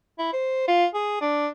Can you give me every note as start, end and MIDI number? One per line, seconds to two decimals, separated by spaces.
0.19 0.32 64
0.33 0.67 72
0.68 0.86 65
0.94 1.21 68
1.21 1.48 62